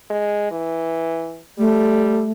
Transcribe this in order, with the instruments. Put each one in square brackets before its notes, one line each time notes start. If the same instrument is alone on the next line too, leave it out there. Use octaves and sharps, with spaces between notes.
[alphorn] G#3
E3
[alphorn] G3 [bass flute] A3